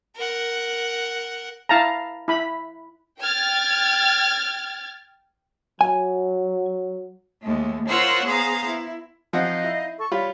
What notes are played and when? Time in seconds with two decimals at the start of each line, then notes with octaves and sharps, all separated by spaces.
0.16 A#4 F#5
1.69 E4 F5 A5 A#5
2.28 E4 B5
3.19 G5 F6 G#6 A6
5.81 F#3 G#5
7.42 D#2 G#3 A3
7.88 F4 A#4 C5 C#5 F#5 E6
8.25 B3 G#4 C5 F5 A#5
8.66 E4
9.33 F3 C4 D#4 D#5 F5 F#5
9.64 E4
9.99 A4 C#6
10.11 G3 F4 C#5 B5